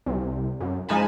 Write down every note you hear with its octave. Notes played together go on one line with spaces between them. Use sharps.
C2
F#2
F3 G#3 D#4 G#5 A5 B5